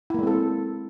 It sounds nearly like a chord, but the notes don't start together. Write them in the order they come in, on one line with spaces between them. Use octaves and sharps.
E4 A#3 G#3 C4 A4